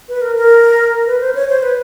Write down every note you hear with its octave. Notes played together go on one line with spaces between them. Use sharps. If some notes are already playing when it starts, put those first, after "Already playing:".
B4
A#4
A#4
B4
C5
C#5
C5
B4